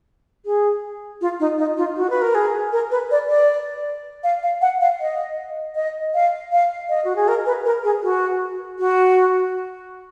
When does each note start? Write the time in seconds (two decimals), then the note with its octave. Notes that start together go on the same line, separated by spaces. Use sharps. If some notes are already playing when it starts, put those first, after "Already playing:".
0.46 G#4
1.21 F4
1.40 D#4
1.58 D#4
1.77 F4
1.96 F#4
2.10 B4
2.22 A#4
2.35 G#4
2.72 A#4
2.91 B4
3.11 D5
3.29 D5
4.24 F5
4.43 F5
4.62 F#5
4.81 F5
5.01 D#5
5.75 D#5
6.14 F5
6.52 F5
6.89 D#5
7.05 F#4
7.16 G#4
7.28 A#4
7.46 B4
7.65 A#4
7.84 G#4
8.03 F#4
8.79 F#4